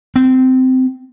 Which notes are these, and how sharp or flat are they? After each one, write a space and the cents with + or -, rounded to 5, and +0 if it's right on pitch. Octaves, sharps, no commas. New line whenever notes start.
C4 -20